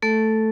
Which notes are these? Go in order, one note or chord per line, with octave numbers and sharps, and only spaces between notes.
A3 A4